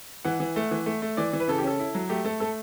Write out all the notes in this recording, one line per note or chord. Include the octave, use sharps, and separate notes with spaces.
E3 F#5
E3
A3
E3
A3
A3
E3 D5
E3
B4
C#3 A4
G4
C#4 A4
E4
F#3
A3 G4
A3 A4
A3 A4